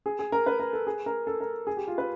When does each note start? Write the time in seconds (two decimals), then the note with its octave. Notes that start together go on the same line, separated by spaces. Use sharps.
0.06 G#4
0.19 G#4
0.32 A#4
0.46 B4
0.60 A#4
0.73 A4
0.87 G#4
1.06 A#4
1.27 A4
1.40 A#4
1.67 G#4
1.77 G4
1.88 F4
1.98 B4